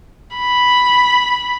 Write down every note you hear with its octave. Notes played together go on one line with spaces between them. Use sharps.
B5